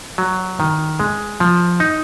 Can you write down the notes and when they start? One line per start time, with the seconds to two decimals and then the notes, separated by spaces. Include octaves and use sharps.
0.18 F#3
0.60 D#3
1.00 G#3
1.40 F3
1.80 D#4